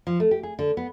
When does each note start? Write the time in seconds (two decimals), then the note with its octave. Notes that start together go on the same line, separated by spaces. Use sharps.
0.07 F3
0.20 A3
0.31 G4
0.43 G#4
0.59 D3
0.77 B3